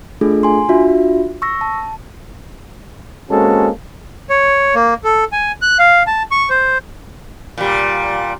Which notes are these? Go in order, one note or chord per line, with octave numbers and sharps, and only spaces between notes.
A3 D4 F4 G#4 A4
G#5 C6
D4 F4 F#4 E5
C#6 E6 A#6
A5
G#3 A#3 C4 C#4 F#4 A4
C#5
A#3
A4
G#5
F#6
F5
A5
C#6
C5
A#2 G3